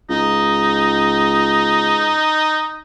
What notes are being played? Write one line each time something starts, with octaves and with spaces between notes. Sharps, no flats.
C#2 D#4